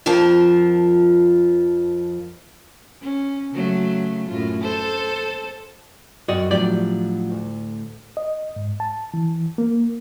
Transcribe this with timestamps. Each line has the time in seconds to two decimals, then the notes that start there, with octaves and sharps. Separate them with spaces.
0.06 F2 F3 F4 A#4 A5
3.02 C#4
3.52 C#3 F#3 A3
4.29 F#2 A2 F4
4.62 A4 C5
6.28 F#2 F#4 D5 D#5 G5
6.51 A2 F3 F#3 D4 G4 D5
7.31 D2
8.17 D#5
8.56 G#2
8.80 A5
9.14 E3
9.58 A#3